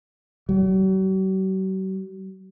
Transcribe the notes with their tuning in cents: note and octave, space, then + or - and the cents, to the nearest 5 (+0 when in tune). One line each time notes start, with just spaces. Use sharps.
F#3 +45